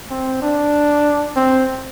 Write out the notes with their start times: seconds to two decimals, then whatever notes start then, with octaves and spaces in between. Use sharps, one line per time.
0.10 C4
0.42 D4
1.36 C4